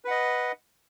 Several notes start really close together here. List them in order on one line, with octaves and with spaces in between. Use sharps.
B4 F#5 D#5